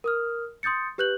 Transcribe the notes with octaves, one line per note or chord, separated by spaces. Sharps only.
A#4 D#6 F6
C6 D#6 G6 A6 C#7
G4 B4 F#6 G6 F#7